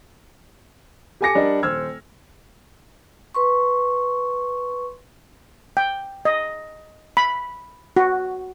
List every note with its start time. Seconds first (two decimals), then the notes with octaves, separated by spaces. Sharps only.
1.21 G4 A4 G#5 D6 A#6 C#7
1.35 G3 D4 A#4 D5 D#5
1.63 D#1 C5 E6 F6 G#6
3.35 B4 C6 C#6
5.77 G5
6.25 D#5
7.17 B5
7.96 F#4